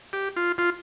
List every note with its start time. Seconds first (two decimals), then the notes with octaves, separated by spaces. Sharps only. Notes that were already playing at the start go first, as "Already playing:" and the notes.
0.13 G4
0.36 F4
0.58 F4